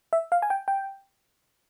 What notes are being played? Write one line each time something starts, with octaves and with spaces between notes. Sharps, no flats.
E5
F5
G#5
G5
G5